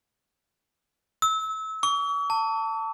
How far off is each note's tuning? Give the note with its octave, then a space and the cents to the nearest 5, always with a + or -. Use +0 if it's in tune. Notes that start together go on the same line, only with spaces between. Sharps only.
E6 -25
C#6 +45
A5 +20